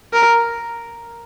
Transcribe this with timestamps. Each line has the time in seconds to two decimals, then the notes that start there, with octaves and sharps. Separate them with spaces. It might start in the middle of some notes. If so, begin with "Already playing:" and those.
0.13 A#4